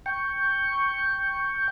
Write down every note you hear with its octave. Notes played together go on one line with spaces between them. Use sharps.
G5 C#6